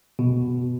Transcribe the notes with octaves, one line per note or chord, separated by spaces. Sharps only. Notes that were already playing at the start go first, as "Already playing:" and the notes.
B2